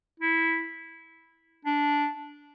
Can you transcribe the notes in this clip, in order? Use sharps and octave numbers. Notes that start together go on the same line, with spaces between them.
E4
D4